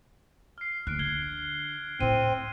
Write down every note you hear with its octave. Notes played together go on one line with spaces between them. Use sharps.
F6 C7
D2 F#6 D7
D3 G#6 G7
A2 C4 E4 D#7